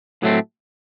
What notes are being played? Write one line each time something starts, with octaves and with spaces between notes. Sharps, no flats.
A2 F#3 A3 C4